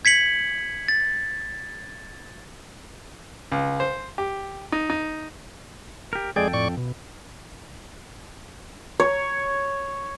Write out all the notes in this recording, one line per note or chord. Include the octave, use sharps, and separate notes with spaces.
G#6 B6 C#7 F#7
A6
C#2
C5
G4
D#4
D#4
G4 A#4
F2 G#3 G#4 A4 D5 G5
A2 D5 C#6
B2
C#5